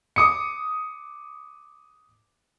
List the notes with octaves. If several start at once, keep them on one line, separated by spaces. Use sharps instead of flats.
D6 D#6 C#7